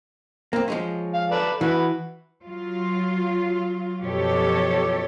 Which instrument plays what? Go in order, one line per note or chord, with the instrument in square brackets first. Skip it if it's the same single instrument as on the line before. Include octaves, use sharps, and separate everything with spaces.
[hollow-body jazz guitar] A#3 C4
F3 G#3 C#4
[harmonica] F5
A4 B4 D5
[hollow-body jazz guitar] E3 [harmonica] F#4 B4
[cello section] F#3 F4
F#2 B2 F3 G4 A4 C#5